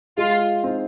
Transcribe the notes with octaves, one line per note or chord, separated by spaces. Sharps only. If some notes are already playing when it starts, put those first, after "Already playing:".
G#3 F4
C4 D#4